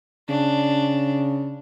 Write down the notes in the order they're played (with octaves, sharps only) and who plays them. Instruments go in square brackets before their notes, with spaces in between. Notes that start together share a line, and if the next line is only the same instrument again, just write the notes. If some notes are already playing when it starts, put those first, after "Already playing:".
[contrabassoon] C#3 [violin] D4